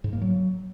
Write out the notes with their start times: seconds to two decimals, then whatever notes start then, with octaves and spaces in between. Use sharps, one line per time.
0.04 G#2
0.13 A#3
0.21 F#3